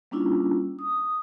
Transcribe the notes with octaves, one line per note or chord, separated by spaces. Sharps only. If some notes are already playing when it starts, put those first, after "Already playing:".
G3 A#3 C#4 D4 E4 F4
D#6